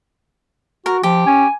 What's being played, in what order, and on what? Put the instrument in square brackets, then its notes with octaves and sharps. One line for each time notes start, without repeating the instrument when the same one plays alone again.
[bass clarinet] F#4 [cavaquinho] A#4
[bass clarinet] F3 [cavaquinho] G4
[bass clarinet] C#4 [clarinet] G#5